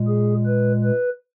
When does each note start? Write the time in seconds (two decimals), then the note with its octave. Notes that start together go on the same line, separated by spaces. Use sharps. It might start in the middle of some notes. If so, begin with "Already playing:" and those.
Already playing: A#2 G#3
0.08 G#4
0.46 B4
0.83 B4